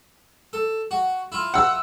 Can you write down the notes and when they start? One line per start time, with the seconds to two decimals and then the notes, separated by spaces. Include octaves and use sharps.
0.53 A4
0.91 F#4
1.32 E4 F4
1.54 F#5 E6